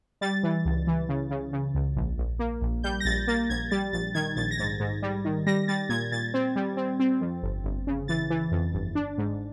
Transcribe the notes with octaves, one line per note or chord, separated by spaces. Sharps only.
G3 A6
E3
C#2
E3
C#3
C#3
C#3
C#2
A#1
A#1
A#3
A#1
G3 G6
A#6
A#1 A6
A#3 A6
A#1 G#6
G3 A6
A#1 A6
D#3 G#6
A#1 A6
A#6
G#2 A6
G#2
G3
D#3
G3 A#6
G3 A6
A#2 G#6
A#2 A6
C4
G3
C4
C4
F2
G1
G1
C#3
E3 A6
E3
F2
G1
D4
G#2